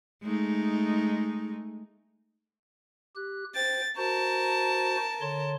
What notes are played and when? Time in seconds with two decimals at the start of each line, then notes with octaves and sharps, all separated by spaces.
0.23 G#3 A3 D#4
3.16 G4 F#6
3.55 C5 G5 A6
3.97 F#4 A#4 C5 A5
5.21 D3 C#5 C6